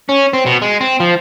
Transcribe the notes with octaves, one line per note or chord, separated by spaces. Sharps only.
C#4
C4
B2
G#3
C4
F3